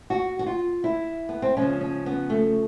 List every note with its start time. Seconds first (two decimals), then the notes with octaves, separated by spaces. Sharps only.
0.10 F#4
0.39 F#4
0.46 F4
0.84 E4
1.29 B3
1.42 C4
1.57 C#3 F3 G#3 C#4
1.81 C#4
2.06 B3
2.30 A3